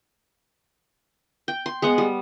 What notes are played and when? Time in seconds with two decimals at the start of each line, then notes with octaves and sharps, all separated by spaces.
1.48 G5
1.66 C6
1.82 G#3 B3 F#5
1.98 G3